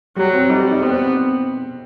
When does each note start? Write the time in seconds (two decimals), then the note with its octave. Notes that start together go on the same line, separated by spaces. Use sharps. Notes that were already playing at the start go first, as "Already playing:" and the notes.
0.16 F#3 G3
0.33 C4
0.50 G3 D#4
0.71 D#4
0.82 B3 C4
0.93 C4